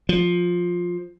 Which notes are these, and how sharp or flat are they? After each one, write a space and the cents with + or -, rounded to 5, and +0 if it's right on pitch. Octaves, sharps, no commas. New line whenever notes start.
F3 +10